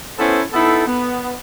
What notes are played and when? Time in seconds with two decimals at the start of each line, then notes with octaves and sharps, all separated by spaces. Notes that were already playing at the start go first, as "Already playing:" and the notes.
0.18 B3 C#4 E4 A4 B4 C5
0.53 B3 D#4 E4 A4
0.86 B3